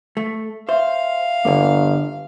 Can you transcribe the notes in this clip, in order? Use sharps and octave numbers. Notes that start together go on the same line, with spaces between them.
A3
C5 E5 F5
G1 D3 A#3